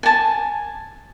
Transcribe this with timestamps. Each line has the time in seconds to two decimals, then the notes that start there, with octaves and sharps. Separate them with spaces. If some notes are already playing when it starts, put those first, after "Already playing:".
0.03 G#5 A5